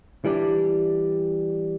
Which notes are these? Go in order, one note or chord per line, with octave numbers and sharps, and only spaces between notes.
E3 G3 D4 G4